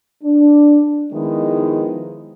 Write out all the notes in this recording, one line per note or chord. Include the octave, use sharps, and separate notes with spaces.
D4
D#3 F3 G#3 B3 D#4 E4